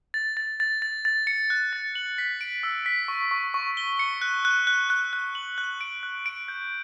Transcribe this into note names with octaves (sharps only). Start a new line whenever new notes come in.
A6
A6
A6
A6
A6
C#7
F#6
A6
F#7
B6
D7
E6
B6
C#6
C#6
C#6
G7
C#7
F#6
F#6
F#6
F#6
F#6
F#7
F#6
D7
F#6
D7
G6